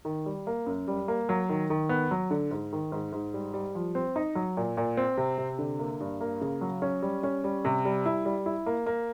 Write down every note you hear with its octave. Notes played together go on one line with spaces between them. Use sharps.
D#3
G3
A#3
F#2
G3
A#3
F#3
D#3
D#3
B3
F#3
D3
G#2
D#3
G#2
G#2
G3
G3
F3
C4
D#4
F#3
A#2
A#2
C4
C3
C3
D3
A#3
G2
A#3
C#3
F#3
C#4
G3
C#4
G3
C3
G3
E4
G3
E4
A#3
A#3